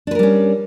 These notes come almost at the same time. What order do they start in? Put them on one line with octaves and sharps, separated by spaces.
D4 B4 A#4 G3 C#4